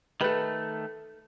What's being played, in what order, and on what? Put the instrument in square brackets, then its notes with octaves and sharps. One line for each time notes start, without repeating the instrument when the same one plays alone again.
[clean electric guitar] D#3 A3 [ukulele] A4 B4